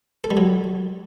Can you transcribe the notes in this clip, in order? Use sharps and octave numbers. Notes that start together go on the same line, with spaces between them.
A4
G3
F#3